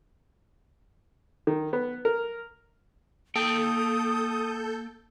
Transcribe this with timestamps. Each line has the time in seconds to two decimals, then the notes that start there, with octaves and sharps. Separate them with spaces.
1.47 D#3
1.73 B3
2.05 A#4
3.35 A#3 A4 G5 D#6 G6